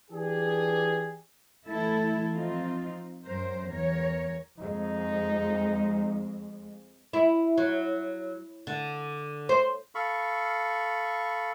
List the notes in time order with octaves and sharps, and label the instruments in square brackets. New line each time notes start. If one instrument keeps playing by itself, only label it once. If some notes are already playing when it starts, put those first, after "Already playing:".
[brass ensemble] E3 D4 G4 G#4
[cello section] E3 A3 E4 A4
F3 C4 D#4 F4
F#2 F#3 A#4 C5
E2 A#4 C#5
[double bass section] F2 G#3 [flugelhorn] D#4
[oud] E4
F#3
D3
C5
[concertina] A4 F5 B5 C#6